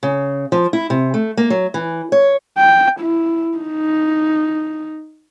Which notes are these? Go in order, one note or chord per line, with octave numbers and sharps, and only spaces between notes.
C#3
F3
E4
C3
A3
A#3
F#3
E3
C#5
G5
E4
D#4